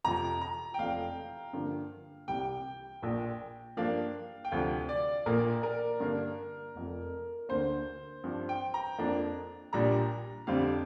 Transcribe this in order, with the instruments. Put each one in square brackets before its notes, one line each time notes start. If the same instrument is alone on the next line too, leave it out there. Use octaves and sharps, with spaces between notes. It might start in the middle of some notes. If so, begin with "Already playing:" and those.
[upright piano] F2 C3 F3 [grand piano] A#5
[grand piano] A#5
G5
[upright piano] F1 F2 F3 [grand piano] F5
[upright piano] G2 D3 F3 A#3
[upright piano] C2 C3 G3 [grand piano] G5
[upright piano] A#1 A#2 A#3
[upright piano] G2 F3 A#3 D4 [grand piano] F5
[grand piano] G5
[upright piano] D2 C3 F3 [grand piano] F5
[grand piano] D5
[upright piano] A#1 A#2 A#3 [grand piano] A#4
[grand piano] A#4
[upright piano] G2 D3 A#3 D4
F1 F2 F3
[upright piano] D2 D3 A#3 [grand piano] C5
[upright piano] G2 F3 C4
[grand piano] G5
A#5
[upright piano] F2 F3 A#3 D4
[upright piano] A#1 A#2 G3 D4 [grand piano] A#5
[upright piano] F2 D3 G3 C4 [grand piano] F5